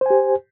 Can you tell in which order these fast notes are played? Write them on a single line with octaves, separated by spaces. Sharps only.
C5 G#5 G4